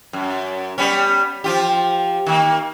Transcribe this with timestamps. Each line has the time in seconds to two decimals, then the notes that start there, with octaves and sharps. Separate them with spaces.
0.13 F#2
0.78 G3 B3 C#4
1.44 F3 F4 G4
2.26 D#3 A#3